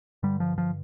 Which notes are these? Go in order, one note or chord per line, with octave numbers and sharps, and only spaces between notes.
G2 D3 G3
F3
F3